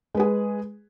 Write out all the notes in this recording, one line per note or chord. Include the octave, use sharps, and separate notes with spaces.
G#3 G#4 B4